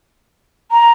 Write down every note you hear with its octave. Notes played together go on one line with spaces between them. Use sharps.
A#5